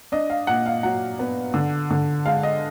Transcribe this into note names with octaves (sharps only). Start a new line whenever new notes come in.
D4 D#5
F5
A#2 F#5
F5
F#3 F#5
B3
D3
D3
G#3 F5
D#5